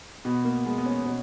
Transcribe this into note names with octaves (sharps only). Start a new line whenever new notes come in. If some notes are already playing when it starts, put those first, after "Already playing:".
B2 B3
A#3
G#3 B3
B3
C#4
B2 C#4